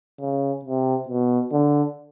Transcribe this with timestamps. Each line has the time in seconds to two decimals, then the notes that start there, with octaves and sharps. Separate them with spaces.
0.21 C#3
0.65 C3
1.09 B2
1.52 D3